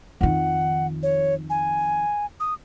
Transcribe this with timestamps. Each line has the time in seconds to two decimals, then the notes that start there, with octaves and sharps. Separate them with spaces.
0.21 F2 D#3 F#5
1.03 C#5
1.50 G#5
2.40 D#6